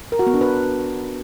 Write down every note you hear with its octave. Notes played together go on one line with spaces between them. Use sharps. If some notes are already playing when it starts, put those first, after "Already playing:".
A#4
F#4
B3
D4
B4